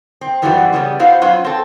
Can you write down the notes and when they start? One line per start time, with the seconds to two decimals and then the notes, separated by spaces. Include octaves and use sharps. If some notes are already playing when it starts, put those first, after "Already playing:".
0.21 C4
0.42 F#2 E3 G3 B3 C4 F#4
0.73 C#3 G3 B3 C#4
0.99 B3 E4 F#4 C5 F5
1.22 F#3 C#4 F4 B4 C5
1.45 C4 A4